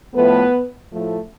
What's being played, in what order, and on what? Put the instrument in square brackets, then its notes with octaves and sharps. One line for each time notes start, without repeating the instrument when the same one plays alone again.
[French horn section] A2 F3 A3 B3 B4
A2 F3 A3